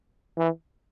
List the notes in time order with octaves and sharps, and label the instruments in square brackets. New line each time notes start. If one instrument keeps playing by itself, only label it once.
[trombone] E3